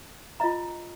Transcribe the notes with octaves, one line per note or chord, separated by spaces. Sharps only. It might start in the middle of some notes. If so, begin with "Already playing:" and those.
F4 D#5 A#5